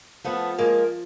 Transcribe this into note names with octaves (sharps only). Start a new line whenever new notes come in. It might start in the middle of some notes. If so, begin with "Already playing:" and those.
F3 A3 B3
F3 G#3 A#3